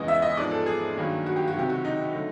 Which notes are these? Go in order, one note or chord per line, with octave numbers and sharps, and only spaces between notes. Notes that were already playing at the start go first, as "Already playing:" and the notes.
Already playing: E2 C#3 E3 G#3 B3 D#5
E5
D#5
G#2 F3 G#3 B3 D5
A4
G#4
G2 D#3 F#3 A#3
F#4
G4
F#4
C#2 C3 D#3 F#3 G4
F#4
D#4
D3 F#3 A3